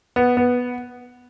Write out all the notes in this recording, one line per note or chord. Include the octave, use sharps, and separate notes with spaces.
B3
B3